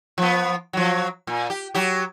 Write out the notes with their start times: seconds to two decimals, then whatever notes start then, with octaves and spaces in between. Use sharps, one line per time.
0.18 F3 B3
0.73 F3 F#3
1.27 A#2
1.50 G4
1.75 F#3 G4